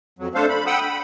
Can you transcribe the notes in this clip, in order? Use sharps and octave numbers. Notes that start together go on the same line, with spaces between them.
F2 F#3
A3 D4 A4 C5 F5
B5
F#5 G5 B5 D#6 E6
B5